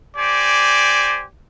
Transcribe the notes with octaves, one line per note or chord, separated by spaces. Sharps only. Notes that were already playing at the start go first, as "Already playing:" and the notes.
G4 C5 D5 G#5